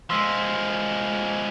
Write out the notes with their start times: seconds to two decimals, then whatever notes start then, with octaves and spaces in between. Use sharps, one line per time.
0.10 F3 G#3 C6 E6 B6